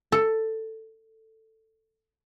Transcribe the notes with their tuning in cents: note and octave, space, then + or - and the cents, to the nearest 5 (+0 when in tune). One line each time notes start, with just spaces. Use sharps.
A4 +10